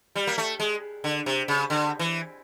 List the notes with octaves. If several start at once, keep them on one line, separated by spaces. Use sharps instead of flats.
G3
A#3
A3
G#3
D3
C3
C#3
D3
E3